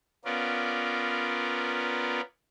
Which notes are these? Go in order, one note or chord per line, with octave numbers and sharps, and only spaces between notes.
B3 C#4 F4 A#4 D5